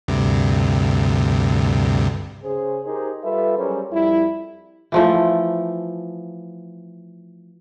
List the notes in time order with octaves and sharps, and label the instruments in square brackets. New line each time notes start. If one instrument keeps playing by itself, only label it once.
[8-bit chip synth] D2 G2 C3
[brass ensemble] C#3 G#4 C5
D#4 G4 G#4 A#4 C5
G3 F4 A4 B4 E5
F#3 G3 C#4 G#4 A#4 C5
F2 G3 E4
[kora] E3 F3 A3